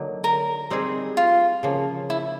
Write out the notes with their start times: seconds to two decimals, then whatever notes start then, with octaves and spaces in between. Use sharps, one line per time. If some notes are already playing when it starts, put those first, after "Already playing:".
Already playing: D3 F#3 A#3 D#4
0.24 A#4
0.70 G3 C4 D#4 G#4
1.17 F4
1.63 C#3 F3 A#3
2.10 E4